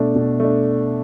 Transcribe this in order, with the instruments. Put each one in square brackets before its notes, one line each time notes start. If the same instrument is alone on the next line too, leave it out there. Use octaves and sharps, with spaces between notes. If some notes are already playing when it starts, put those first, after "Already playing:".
Already playing: [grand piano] B2 A3 D4
B2
A3 D4